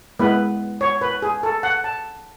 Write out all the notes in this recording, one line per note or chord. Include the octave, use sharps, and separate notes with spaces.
G#3 B3 E4 B4
C#5
B4
G#4
A4
F#5
A5